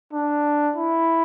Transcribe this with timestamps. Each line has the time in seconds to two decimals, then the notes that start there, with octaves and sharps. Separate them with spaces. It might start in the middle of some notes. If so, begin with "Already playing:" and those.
0.13 D4
0.76 E4